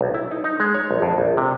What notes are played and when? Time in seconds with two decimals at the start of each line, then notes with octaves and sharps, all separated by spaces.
0.01 B1
0.14 E4
0.31 D#4
0.44 D#4
0.60 G#3
0.74 C#5
0.91 A#1
1.02 F2
1.18 A#1
1.37 C3